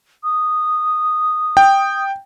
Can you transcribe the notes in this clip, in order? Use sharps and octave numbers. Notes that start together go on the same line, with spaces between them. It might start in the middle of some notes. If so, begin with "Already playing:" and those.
D#6
G5